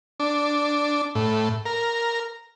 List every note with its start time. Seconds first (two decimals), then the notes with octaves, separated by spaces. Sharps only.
0.20 D4
1.15 A2
1.66 A#4